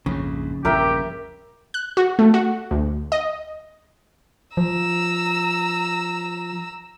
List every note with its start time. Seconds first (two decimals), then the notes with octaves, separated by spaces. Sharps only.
0.06 A#1 F2 G#2 C#3
0.65 A#1 E2 G2 G4 A#4 E5 G5
1.74 F#6
1.97 F#4
2.19 A3
2.34 F#4
2.71 D2
3.12 D#5
4.57 F3 A#5 E6